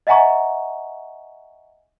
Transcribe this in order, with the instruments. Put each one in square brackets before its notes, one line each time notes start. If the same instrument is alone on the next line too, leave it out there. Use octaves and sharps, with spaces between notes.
[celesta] D#5 E5 F#5 G#5 A#5 C#6